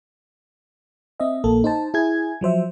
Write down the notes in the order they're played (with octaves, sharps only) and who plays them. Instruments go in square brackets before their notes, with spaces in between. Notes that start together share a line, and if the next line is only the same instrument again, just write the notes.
[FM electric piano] C4 D#5 E5
A#1 A#3 A4
D#4 C5 A5
E4 G#4 G#5 G#6
F3 F#3 C5 E5